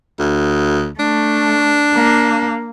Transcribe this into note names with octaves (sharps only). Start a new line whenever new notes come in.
D2
A3 D4
A#3